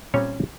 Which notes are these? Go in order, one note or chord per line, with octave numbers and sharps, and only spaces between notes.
A#2 G3 C4 C#4 C#5